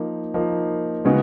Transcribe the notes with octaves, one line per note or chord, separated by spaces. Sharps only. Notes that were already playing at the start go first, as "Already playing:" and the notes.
Already playing: F3 A#3 D#4
F3 A#3 D#4
C#3 G#3 B3 D#4 F#4